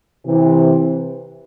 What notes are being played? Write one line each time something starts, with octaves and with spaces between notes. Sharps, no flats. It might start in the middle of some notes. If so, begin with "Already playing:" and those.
C3 E3